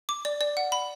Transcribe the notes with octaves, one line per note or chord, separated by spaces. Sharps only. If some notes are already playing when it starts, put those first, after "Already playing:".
D6
D5
D5
F#5
B5